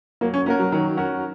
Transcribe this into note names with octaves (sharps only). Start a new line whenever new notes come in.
F#3 A#3
C#4
A#3 C#4 F#4 A#4
F#3
D#3 F#3
C#4 F#4 A#4